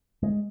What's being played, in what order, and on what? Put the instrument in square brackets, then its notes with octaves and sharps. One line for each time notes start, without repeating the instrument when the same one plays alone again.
[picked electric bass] G#3